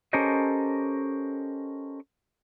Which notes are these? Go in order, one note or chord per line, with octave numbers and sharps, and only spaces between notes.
C#4 G4 A4 A#4 C5 D#5